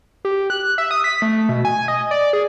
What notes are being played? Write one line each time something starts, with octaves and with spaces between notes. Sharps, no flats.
G4
F#6
F#6
E5
D#6
B6
A3
B2
G#5
D#5
D5
G#4